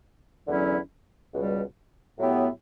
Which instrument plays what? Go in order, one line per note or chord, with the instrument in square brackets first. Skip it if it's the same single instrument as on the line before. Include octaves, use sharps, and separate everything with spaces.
[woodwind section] E2 D3 F#3 C#4 E4
C#2 B2 G3
A2 F#3 B3 E4 G4